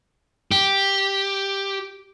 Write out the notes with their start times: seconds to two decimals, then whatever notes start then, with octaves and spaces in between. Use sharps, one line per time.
0.52 G4